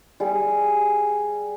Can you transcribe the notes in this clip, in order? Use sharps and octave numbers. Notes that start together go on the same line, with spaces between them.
G3 G#4